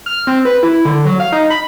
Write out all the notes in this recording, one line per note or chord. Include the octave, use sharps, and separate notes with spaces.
F6
C4
B4
E4
D3
F#3
F5
D#4
B5